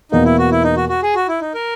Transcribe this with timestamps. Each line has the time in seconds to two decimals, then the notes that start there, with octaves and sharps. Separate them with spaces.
0.12 E2 B2 A#3 D#4
0.25 E4
0.38 F#4
0.51 E4
0.64 D#4
0.77 F#4
0.89 F#4
1.03 G#4
1.15 F#4
1.28 E4
1.41 D#4
1.54 A#4